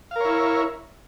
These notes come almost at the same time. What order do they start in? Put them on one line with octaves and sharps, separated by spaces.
F5 A#4 C#5 E4